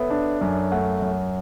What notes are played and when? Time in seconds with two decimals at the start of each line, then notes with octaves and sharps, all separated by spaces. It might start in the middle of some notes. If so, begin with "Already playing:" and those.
Already playing: B3 A4 C#5 E5
0.10 D4
0.41 F#2
0.72 A3 F#5
1.02 F#2